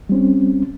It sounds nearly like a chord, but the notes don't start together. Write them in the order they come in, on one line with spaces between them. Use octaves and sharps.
G3 C4 C#4